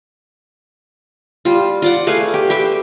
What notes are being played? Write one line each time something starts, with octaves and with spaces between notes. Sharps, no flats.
G3 F4
F4 D5 F#5
A3 G#4 B4 F5
G4
G4 B4 E5